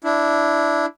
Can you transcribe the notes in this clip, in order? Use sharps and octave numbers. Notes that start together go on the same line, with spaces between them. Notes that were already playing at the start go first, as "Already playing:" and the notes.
D4 E4